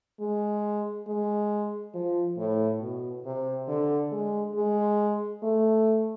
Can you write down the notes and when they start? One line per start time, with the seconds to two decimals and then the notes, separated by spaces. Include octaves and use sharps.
0.20 G#3
1.07 G#3
1.94 F3
2.37 A2
2.81 B2
3.25 C3
3.68 D3
4.12 G#3
4.55 G#3
5.43 A3